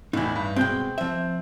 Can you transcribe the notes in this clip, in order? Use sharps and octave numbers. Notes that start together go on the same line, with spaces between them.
E2 A2 D#4 E4
G2
B2 G#3 C4 G5 G6
F3 C4 E5